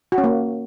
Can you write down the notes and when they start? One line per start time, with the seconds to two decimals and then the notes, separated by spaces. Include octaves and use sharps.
0.12 F#4
0.18 C#4
0.24 A#3